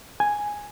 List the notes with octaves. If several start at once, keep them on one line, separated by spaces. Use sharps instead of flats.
G#5